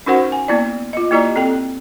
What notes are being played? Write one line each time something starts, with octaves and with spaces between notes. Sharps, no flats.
C#4 D#4 F#4 A#4 C5 F#5
G#5
A#3 B3 E4 D5
F4 D#5
A#3 E4 G4 D5 D#5 A#5
C4 A4 G5